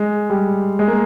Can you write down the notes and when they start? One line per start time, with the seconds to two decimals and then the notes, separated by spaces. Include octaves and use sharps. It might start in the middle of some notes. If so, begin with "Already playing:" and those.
Already playing: G#3
0.30 G3
0.79 G#3
0.88 A#3